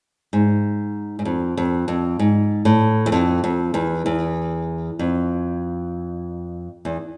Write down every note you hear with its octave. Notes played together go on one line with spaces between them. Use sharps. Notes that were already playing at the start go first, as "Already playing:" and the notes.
G#2
G#2
F2
F2
F2
G#2
A2
E2
F2
F2
E2
E2
F2
E2